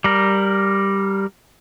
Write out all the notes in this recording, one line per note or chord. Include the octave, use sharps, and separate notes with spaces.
G3 A#4